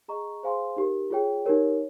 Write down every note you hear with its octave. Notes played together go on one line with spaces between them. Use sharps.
G#4 D#5 A#5 C#6
G#4 C5 F5 G#5 C6
D#4 G4 A#4
F4 G#4 C#5 G5
D#4 G4 A#4 C#5